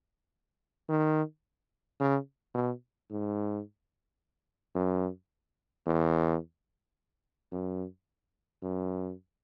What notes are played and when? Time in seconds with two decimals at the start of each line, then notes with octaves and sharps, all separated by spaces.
0.89 D#3
2.00 C#3
2.54 B2
3.11 G#2
4.75 F#2
5.86 E2
7.52 F#2
8.62 F#2